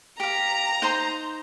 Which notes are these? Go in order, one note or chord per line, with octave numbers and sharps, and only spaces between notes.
G4 F5 A#5
D#4 C5 C6